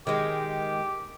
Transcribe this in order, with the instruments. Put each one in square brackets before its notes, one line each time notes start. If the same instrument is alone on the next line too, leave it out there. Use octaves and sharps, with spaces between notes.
[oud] D#3 G#3 [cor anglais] G4